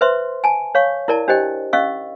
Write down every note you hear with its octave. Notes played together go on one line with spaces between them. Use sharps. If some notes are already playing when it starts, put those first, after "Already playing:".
B4 C5 E5 C6
G#5 A5
C#5 F5 C#6
E4 A#4 D5 A5
D4 G4 C5 D#5 G5
C#4 D#5 F5 C#6 E6